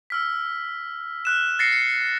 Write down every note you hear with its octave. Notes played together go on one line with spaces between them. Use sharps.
E6 F6 B6
F6 F#6 E7
A6 A#6 C7 C#7
C#7